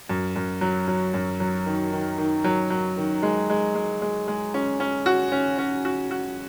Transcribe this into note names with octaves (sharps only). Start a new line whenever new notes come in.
F#2
F#2
F#3
F#3
F#2
F#3
D#3
D#3
D#3
F#3
F#3
D#3
G#3
G#3
G#3
G#3
G#3
C#4
C#4
F#4
C#4
C#4
F#4
F#4